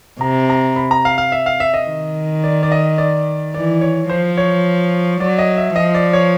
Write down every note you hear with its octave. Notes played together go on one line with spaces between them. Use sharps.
C3 A#5
A#5
B5
A#5
F5
F5
E5
F5
E5
D#5
D#3
D5
D5
D#5
D5
E3 D5
C#5
F3 C5
C#5
F#3 D5
D#5
E5
F3 D#5
D5
C#5